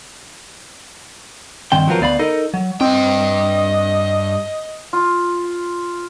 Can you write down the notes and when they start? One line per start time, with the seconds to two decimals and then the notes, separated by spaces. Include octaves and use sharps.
1.72 G2 D#3 C4 G5
1.88 F3 F#3 B3 C4 F4 A#4
2.01 D2 B3 D5 F5 B5
2.19 D#4 A4 A#4 D#5
2.54 F#3
2.81 G2 C4 D#5 G5
4.93 F4